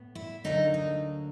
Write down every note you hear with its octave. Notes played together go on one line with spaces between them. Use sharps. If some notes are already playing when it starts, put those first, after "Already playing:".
Already playing: A2 B3
E4
D2 D3 F#3 A#3 D#4
D#4